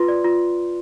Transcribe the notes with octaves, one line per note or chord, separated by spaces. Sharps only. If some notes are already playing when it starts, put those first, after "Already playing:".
Already playing: F4 B4 C6
D5
F4